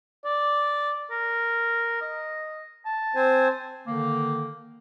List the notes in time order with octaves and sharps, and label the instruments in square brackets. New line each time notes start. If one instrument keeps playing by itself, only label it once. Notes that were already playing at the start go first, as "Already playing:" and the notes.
[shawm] D5
[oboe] A#4
D#5
A5
[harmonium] C4 C5 G#5
[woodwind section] D3 D#3 A#3